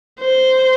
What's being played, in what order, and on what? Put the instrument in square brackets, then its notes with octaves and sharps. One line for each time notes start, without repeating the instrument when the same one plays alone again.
[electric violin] C5